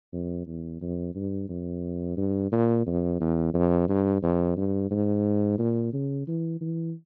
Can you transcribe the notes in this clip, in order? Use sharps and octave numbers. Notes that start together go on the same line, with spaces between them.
F2
E2
F2
G2
F2
G2
A#2
F2
E2
F2
G2
F2
G2
G#2
A#2
C#3
E3
E3